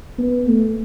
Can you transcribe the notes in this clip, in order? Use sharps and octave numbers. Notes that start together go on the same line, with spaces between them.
B3
A3